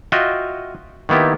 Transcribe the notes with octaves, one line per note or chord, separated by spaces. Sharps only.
F4 F#4 D#5 E5 G5
D#3 A#3 B3 E4 G4